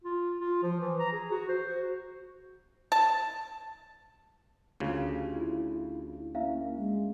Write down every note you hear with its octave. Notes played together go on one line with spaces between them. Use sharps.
F4
F4
F3
E3
A#5
G#4
F#4
C5
F#4
A5
D2 C#3 F4 G4 F5
E4 F4
A#3 C#4 E4 E5 F5
G#3